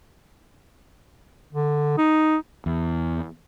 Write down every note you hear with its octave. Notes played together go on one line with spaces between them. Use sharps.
D3
D#4
E2